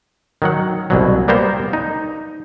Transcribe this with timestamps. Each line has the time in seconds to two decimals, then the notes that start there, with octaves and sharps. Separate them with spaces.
0.42 D#3 F#3 F#5
0.90 C2 B2 F#3
1.28 G3 A#3 B3 A#4 C5
1.73 D#4